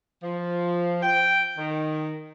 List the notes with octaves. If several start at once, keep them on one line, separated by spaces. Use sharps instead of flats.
F3
G5
D#3